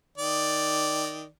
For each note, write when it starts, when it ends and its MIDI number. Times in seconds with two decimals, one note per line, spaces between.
0.18 1.27 51
0.18 1.27 74